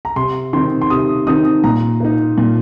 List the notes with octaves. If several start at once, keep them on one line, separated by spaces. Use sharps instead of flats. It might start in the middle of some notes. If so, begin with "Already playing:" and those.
A#5
C3 C6
D#3 C4 D#4 C6
C6
C3 D#6
D#3 C4 D#4 D#6
A#2 A#5
A#3 D#4
A#2